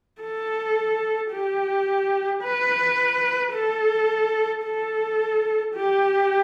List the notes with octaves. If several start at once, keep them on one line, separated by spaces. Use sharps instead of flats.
A4
G4
B4
A4
A4
G4